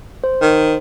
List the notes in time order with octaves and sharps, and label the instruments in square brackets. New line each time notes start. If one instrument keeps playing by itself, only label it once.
[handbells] C5
[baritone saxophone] D#3